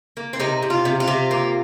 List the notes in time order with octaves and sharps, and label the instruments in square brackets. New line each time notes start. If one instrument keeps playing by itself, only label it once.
[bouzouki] A#3
C4
C3 D#4
C3
F4
C3
F4
C3
A#3